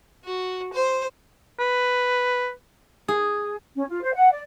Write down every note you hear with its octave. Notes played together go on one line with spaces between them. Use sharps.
F#4
C5
B4
G#4
C#4
F4
C5
F#5
D5